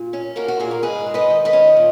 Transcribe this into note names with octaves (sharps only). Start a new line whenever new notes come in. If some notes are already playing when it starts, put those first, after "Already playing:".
Already playing: A#2
C#4
A#3 F#4 A#4
F#4
A#2 G#4
A#4
G#2 G#4 B4
G#3
B4 D#5
D#3
B4 D#5
C#4
A#2